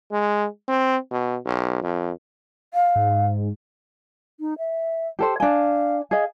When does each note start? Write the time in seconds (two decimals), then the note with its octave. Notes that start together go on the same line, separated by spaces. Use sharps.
0.12 G#3
0.68 C4
1.11 B2
1.46 B1
1.83 F2
2.74 F5
2.95 G#2
4.40 D#4
4.58 E5
5.19 G4 A4 C5
5.40 D4 F5 G#5
6.11 G#4 D#5 F5